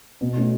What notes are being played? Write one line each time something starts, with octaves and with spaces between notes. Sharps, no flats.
B2
A3 C#4 F#4